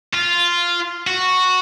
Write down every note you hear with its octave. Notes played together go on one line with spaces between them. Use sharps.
F4
F#4